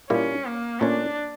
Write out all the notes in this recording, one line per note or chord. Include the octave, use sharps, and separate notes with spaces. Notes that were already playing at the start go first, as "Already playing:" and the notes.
A#2 G3 A#3 C#4 E4 G4
A#3
A#2 A3 C#4 D4